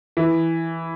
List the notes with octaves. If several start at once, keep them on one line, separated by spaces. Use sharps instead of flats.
E3